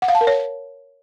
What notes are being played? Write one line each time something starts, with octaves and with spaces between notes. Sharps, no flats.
F#5
F5
A5
A#4
C#5